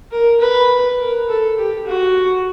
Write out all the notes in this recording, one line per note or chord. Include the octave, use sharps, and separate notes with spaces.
A#4
B4
A#4
A4
G4
F#4